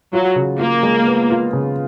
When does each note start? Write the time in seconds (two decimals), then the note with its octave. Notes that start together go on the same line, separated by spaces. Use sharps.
0.13 F#3 F4
0.36 C#3
0.59 A#3 F4
0.83 G#3
1.06 B3
1.30 F4
1.53 C#3